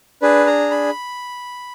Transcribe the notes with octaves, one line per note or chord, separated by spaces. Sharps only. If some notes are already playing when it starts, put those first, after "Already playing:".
D4 G#4 B4
A#5
B5